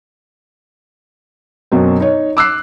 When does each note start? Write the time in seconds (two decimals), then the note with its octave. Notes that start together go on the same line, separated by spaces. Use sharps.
1.72 F#2 B2 F#3 C4
2.00 D#4 C#5
2.37 D6 E6 F#6 C7